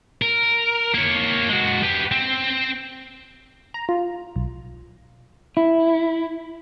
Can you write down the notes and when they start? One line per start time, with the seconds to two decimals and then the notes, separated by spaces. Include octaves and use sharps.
0.22 A#4
0.94 A#3 C#5
1.49 G#3 F#4
1.83 G4 B4
2.11 C4
3.74 A#5
3.89 F4
4.36 B1
5.57 E4